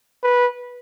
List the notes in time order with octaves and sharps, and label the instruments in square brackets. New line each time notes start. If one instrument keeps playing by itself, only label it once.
[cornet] B4